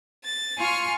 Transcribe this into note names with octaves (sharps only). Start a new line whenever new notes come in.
A6
F4 G#5 C6 C#6 F6